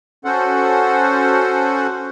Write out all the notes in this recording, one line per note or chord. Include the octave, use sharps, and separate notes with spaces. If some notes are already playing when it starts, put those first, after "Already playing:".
C#4 F#4 A4 C5 F#5